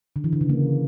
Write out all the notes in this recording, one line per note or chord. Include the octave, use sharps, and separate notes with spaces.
D3
E3
D3
C#3
A#3